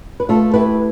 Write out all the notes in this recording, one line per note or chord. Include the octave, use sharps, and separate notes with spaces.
B4
A3 F4 A4
E4 G4 B4